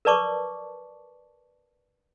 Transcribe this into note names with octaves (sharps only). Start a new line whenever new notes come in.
A#4 B4 D5 A5 C#6 D6